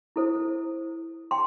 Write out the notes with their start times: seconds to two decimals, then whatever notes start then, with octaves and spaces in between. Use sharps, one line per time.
0.16 E4 A4 C5
1.31 G5 C6